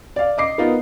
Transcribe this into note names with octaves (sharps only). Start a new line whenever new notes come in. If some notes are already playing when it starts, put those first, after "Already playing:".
D5 F5
D#5 D6 C7
B3 D#4 F4 A#4